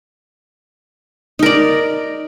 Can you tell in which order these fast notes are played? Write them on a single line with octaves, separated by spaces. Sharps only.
D#4 A#4 D5